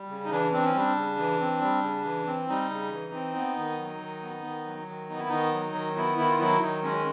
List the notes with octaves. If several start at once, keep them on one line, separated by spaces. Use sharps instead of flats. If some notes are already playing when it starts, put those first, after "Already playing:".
Already playing: G3
C#3
D#4
E3 D4
C4 D4
C#4
G3 D4
C#3
E3
C4
G3
C#3
E3
C4
G3 D#4
C#3
E3
C4
B3
D#3
F#3
D#3
B3
D#3
F#3
D#3
B3 D#4
E4
D#3 D#4
F#3
D#3
B3 E4
D#3 E4
F4
F#3 E4
D#3 D#4
G#3 C#4